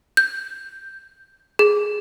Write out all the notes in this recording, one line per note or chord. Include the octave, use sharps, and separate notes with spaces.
G6
G#4